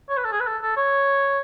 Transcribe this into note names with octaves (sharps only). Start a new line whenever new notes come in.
C#5
B4
A4
G#4
B4
A4
A4
C#5